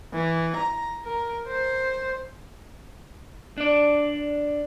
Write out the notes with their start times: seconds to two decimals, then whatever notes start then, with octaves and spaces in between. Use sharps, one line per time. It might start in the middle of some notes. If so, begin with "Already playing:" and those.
0.13 E3
0.56 A#5
1.05 A#4
1.48 C5
3.58 D4 D5